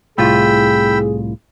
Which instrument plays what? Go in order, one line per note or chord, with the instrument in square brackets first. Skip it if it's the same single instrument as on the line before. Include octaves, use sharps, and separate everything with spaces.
[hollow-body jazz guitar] C2 A2 F4 [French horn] G#4 [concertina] G5 B5 E6